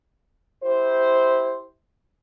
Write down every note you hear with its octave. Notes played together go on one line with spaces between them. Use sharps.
E4 G4 C5